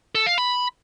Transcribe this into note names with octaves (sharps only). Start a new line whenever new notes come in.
A4
F5
B5